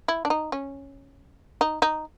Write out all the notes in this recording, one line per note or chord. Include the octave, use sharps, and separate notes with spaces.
E4
D4
D#4
C#4
D#4
D#4